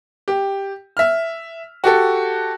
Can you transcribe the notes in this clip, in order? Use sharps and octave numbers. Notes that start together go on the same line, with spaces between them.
G4
E5 F6
F#4 G4 A4